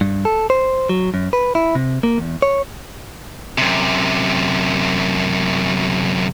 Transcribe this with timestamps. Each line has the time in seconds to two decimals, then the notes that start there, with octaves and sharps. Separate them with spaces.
0.01 G2
0.25 A4
0.50 C5
0.89 F#3
1.14 F#2
1.33 B4
1.55 E4
1.75 C3
2.03 A#3
2.18 E2
2.42 C#5
3.58 F#2 C3